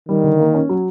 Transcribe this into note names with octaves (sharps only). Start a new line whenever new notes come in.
D#3 G3
D3
A#3
C#4
F#3